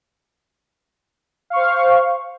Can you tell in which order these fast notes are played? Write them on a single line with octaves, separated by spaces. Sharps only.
F5 C#6 C5